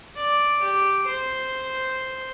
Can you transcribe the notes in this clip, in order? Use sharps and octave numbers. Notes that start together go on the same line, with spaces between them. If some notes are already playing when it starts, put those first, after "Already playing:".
D5
G4
C5